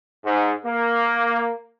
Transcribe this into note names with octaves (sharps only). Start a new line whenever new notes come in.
G#2
A#3